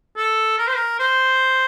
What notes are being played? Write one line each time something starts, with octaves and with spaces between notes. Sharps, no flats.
A4
A#4
C5
A#4
C5